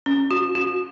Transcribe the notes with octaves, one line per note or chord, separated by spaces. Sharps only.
C#4
F#4
F#4